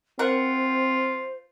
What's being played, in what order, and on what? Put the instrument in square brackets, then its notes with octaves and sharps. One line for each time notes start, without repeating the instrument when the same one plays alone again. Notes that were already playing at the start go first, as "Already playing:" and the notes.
[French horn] C4 [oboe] F4 [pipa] A#4 F#5 [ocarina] C5